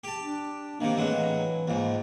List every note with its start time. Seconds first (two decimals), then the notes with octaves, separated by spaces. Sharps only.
0.04 G4 A5
0.21 D4
0.81 C3 D#3 A#3
0.97 A2 E3 F#3 G#3
1.68 C#2 G#2 A#3